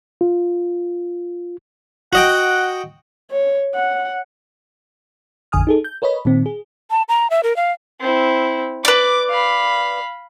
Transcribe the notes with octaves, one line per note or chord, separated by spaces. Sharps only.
F4
F#4 D#5 F#5 G5
C#5
F#5
A1 F2 D3 G#5 D#6 F6
D#4 G#4 A4
G6
A#4 B4 C#5 D#5 B5
A#2 D#3 C4
G#4
A5
A#5
E5
A#4
F5
C4 E4
B4 D5 D6
F5 B5